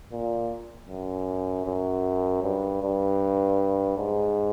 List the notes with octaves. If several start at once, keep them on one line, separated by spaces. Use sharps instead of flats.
A#2
F#2
F#2
G2
G2
G#2